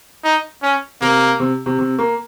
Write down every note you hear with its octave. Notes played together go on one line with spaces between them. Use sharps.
D#4
C#4
C3 A#3
C3
C3
C3
A#3